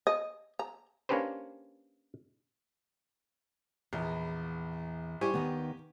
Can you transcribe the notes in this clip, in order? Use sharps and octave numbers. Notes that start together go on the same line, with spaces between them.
D#5
A#5
A#3 C#4 D4 G4 B4 C5
A#1 E2
G3 E4 G4 C5 G#5 C#6
D#2 D#3 B3